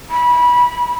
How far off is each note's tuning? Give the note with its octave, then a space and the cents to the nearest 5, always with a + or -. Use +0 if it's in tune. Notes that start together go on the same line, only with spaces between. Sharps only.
B5 -25